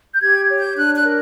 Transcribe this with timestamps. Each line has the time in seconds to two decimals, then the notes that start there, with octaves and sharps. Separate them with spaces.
0.14 G6
0.22 G4 G#6
0.49 C#5
0.59 G6
0.76 D4 F#6
0.94 F#6
1.04 A#4